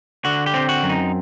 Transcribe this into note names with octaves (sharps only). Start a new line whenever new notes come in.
D3 F#4
G4
C4
F#4
F#2
D#4